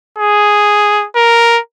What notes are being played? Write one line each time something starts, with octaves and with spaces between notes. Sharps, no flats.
G#4
A#4